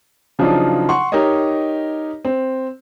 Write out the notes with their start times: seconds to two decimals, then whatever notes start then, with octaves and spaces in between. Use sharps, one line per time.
0.39 C#3 F3 F#3 D4 D#4 F4
0.89 F#5 C6 C#6
1.12 D#4 G4 A#4 C#5 D#5
2.25 C4